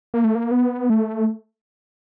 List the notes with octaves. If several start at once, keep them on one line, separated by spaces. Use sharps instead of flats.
A#3
A3
A#3
B3
A3